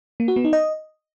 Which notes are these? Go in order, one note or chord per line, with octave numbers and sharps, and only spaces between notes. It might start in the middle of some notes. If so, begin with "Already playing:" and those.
A#3
F#4
B3
D#4
D#5